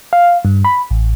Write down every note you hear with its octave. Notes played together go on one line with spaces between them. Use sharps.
F5
G2
B5
A1